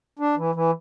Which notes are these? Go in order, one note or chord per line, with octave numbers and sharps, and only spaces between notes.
D4
E3
E3